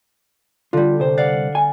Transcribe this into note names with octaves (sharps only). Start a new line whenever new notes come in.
D3 G3 F4
C2 C5
D5 F5 F#5
G#5